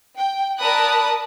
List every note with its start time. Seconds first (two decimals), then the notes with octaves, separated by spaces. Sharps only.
0.17 G5
0.60 A#4 D5 A5 B5 D#6 F#6